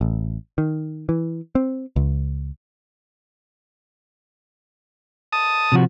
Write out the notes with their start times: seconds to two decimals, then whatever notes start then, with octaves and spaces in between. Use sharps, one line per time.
0.01 A1
0.58 D#3
1.09 E3
1.55 C4
1.96 C#2
5.32 A5 D#6
5.72 C3 F3 F#4